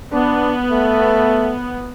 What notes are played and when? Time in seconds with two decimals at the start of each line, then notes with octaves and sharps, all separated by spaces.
0.12 B3 D4
0.70 A3